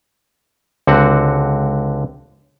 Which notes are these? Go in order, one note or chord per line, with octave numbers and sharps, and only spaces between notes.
C#2 D3 C4 F#4 F#5